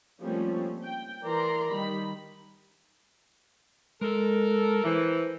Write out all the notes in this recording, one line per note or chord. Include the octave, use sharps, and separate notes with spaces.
F3 G3 A3 A#3 C4 C#4
G5
E3 A#4 D5 A#5 C6
D#3 G3 B5
G#3 A4 A#4
E3 A#4 C5